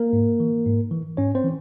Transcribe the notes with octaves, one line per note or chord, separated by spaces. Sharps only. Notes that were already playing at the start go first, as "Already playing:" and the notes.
Already playing: A#3 A#4
G#2
E3
G#2
E3
G#2 C#4 C#5
C4 C5
E3